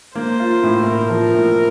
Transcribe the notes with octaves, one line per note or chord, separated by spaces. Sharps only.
A#3 C5
F4
A2
A2 A#4
F3
A2